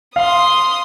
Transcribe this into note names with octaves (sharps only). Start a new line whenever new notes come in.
F5 C6 D#6